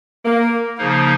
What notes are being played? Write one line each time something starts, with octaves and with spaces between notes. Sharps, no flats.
A#3
C#3 F3 A#3 D#4